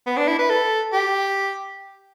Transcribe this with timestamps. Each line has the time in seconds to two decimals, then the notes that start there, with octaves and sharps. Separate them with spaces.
0.06 B3
0.17 D4
0.27 E4
0.39 B4
0.50 A4
0.93 G4